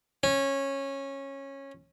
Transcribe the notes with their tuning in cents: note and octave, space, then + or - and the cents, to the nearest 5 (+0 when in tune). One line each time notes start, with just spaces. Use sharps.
C#4 -15